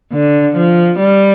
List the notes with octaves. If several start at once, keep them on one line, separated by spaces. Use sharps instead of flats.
D3
F3
G3